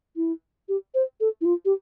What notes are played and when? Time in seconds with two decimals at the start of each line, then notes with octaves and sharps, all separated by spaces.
0.16 E4
0.69 G4
0.95 C5
1.21 A4
1.41 E4
1.45 F4
1.65 G4